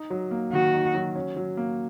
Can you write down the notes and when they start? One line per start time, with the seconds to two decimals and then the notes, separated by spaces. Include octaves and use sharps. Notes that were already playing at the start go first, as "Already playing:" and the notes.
Already playing: D#4
0.10 F#3
0.31 A#3
0.53 D#3 F#4
0.74 D#4
0.94 F#3
1.15 C#4
1.36 F#3
1.57 A#3